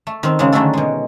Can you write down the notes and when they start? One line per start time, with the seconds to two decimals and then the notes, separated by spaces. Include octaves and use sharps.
0.07 A3
0.23 D#3 C4
0.39 C#3 F#3 G#3
0.52 D3 D#3 F#3 G#3 A3 A4
0.73 B2 G#3